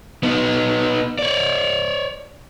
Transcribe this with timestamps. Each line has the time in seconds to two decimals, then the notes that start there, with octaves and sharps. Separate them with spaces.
0.23 B3 D#4
1.19 C#5 D5